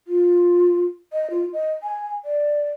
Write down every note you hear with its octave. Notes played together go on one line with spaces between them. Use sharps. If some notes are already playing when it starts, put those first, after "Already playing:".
F4
D#5
F4
D#5
G#5
D5